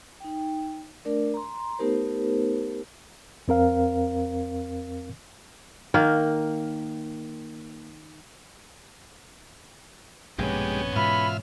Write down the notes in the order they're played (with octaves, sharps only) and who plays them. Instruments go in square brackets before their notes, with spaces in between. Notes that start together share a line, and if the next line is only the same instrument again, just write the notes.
[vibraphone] D#4 G5
A3 D4 A#4 D5
A#5 C6
A3 B3 D#4 G4 A#4 C5
[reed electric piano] F2 C4 A#4 F5
[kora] D#3 A#3
[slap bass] A#1 G2 B2 [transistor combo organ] G#3 G4 [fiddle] B3 C#4
[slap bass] G#2 B2 E3 [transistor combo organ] F4 E5 F6 [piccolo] B5